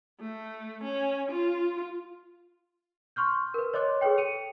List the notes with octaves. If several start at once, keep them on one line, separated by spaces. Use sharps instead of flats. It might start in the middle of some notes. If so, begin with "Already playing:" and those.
A3
C#4
F4
C6 C#6 F6 G6
A#4 B4
C#5 D#5 C6 D6 F#6
G#4 A4 B4 C#5 G5
C#7 D#7 F7